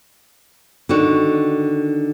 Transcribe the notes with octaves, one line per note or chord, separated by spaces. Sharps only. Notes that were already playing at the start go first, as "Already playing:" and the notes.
D3 D#3 F#4